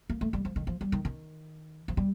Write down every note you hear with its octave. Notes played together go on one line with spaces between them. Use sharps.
A#3
A3
G3
F3
D#3
F3
G3
D#3
D#3
F3
G3